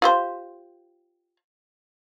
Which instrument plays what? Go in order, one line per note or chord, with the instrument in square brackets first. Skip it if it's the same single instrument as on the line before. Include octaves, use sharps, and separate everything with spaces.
[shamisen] F4 G4 C5